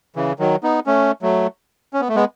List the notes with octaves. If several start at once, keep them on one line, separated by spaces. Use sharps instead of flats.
C#3 E3
D#3 F#3
B3 D#4
A3 C#4
F#3 A3
C#4
B3
A3
G#3 B3